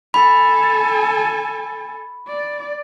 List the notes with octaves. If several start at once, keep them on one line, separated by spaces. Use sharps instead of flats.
A4 G#5 B5
D5